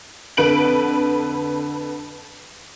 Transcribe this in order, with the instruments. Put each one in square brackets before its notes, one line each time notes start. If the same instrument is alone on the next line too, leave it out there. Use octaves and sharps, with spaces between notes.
[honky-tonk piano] F2 D3 B4 D7 F#7